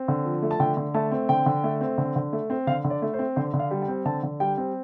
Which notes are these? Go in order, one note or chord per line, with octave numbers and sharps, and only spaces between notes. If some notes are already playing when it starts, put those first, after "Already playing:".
Already playing: C4
D3
F3
A3
A5
D3 G5
D3
A3 A5
C4
D3 G5
D3
A3
C4
D3
D3
A3
C4
D3 F5
D3
D5
A3
C5
C4
D3 C5
D3
F5
G3
G5
C4
D3 A5
D3
G3 G5
C4